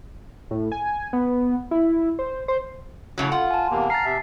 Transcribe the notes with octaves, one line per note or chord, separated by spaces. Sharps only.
A2
G#5
B3
E4
C5
C5
A2 C#3 F#3
F4 F#5
G#5 A5
E2 C3 A#3
A#5 F6 A6 C7
C3 E5